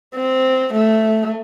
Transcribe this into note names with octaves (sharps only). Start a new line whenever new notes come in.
C4
A3